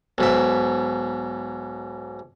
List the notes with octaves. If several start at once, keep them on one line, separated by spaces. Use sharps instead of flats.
B1 G#2 E5